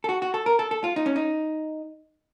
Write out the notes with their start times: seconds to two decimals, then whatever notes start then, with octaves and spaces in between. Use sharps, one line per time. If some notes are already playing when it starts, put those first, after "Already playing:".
0.04 A4
0.09 F#4
0.22 F#4
0.34 A4
0.46 A#4
0.59 A4
0.71 A4
0.84 F4
0.96 D#4
1.06 C#4
1.16 D#4